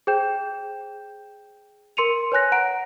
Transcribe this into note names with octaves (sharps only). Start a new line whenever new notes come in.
G#4 C5 G5 G6 E7
A#4 C6 C#7 D#7 F7
B4 C#5 G#5 F#6 A#6
F#5 A#5 D7